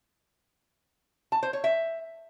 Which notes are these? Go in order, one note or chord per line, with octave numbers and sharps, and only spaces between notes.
A5
C5
C#5
E5